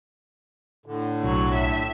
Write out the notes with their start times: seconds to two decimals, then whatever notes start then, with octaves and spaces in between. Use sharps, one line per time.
0.86 A2 D3
1.23 B1 F#3
1.55 E5